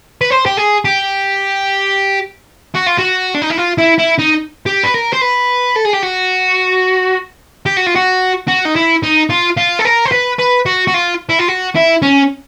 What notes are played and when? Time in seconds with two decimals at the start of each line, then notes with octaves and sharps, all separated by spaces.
0.21 B4
0.30 C5
0.46 G4
0.57 G#4
0.85 G4
2.75 F#4
2.87 F4
2.98 F#4
3.35 D4
3.42 D#4
3.50 E4
3.58 F4
3.78 E4
3.98 E4
4.18 D#4
4.66 G4
4.84 B4
4.94 A#4
5.13 C5
5.21 B4
5.76 A4
5.85 G#4
5.94 G4
6.03 F#4
7.66 G4
7.77 F#4
7.86 F4
7.96 F#4
8.48 F#4
8.65 D#4
8.76 E4
9.03 D#4
9.30 F4
9.57 F4
9.79 A4
9.85 A#4
10.05 C5
10.12 B4
10.39 B4
10.66 F#4
10.87 F#4
10.94 F4
11.29 E4
11.39 F4
11.48 F#4
11.75 E4
12.02 C#4